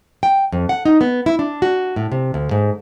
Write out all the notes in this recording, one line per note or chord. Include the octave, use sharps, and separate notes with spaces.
G5
F2
F#5
D#4
B3
E4
D4
F#4
A2
C3
D2
G#2